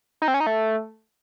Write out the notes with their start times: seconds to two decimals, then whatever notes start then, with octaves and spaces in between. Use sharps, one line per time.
0.22 D#4
0.28 C4
0.34 C#4
0.40 D#4
0.47 A3